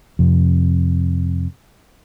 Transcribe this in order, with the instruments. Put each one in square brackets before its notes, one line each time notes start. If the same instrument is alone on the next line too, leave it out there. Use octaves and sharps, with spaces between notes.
[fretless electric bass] F2 C3